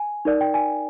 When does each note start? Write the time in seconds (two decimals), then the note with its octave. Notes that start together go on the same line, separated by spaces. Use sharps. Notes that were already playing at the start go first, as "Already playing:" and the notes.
Already playing: G#5
0.25 D#4 A#4 D5
0.41 G5
0.54 G#5